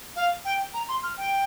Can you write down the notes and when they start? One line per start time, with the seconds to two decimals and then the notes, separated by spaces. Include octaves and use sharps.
0.16 F5
0.45 G5
0.74 A#5
0.88 C6
1.03 F6
1.17 G5